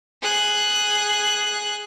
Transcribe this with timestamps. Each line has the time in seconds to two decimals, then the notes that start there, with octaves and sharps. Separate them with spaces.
0.22 G#4 F#6